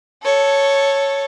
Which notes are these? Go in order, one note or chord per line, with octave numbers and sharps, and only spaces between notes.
A4 C#5